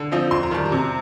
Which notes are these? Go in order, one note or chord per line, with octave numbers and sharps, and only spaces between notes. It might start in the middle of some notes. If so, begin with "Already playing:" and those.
Already playing: D3
F3 C4 D#4
F2 C6
A#5
D#3 G3 A5
A#5
C3